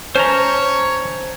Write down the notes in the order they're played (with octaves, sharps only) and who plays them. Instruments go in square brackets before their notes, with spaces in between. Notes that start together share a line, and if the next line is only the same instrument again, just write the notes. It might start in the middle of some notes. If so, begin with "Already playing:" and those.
[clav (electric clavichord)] C#4 [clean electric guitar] C5 A5 A#5 [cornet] C#5